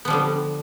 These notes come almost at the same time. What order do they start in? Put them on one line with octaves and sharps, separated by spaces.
B3 F3 G3 D3